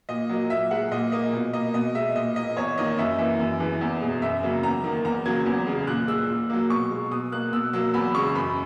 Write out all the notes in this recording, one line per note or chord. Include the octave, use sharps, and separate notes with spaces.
A#2 D#5
F#3 A#3
A#2 E5
G#3 F#5
A#2 D#5
A#3 D#5
B2
A#3 D#5
B2 D#5
G#3 E5
A#2 D#5
A#3 D#5
E2 C#5
D#3 A#3 D#5
F#2 E5
E3 A#3 E5
F#2
E3 G#3
E2
B2 G#3
F#2 E5
C#3 F#3 A#3
E2 A#5
D#3 A#3
E2 A#5
C#3 F#3 A#3 G#6
E2
C#3 G#3
A#2 F#6
G#3 E6
A#2
F#3 A#3
B2 C#6
G#3
B2 D#6
A#3 F#6
B2 E6
F#3 A#3 E6
E2 B5
C#3 G#3 C#6
F#2 B5